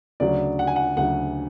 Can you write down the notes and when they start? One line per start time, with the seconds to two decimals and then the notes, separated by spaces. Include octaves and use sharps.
0.20 D2 C#3 F#3 D5
0.59 F#5
0.67 G#5
0.76 F#5
0.97 D2 C#3 F#3 F#5